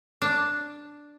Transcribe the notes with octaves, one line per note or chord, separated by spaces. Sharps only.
D4